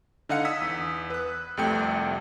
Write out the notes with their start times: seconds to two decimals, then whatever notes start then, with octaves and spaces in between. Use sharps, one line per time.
0.29 D3 D#4 D#5 F5 F#5 C#7
0.45 D#6 E6 G#6 B6
0.62 E2
1.10 B4 F#6
1.57 C2 F2 C3 A3 G5 C#7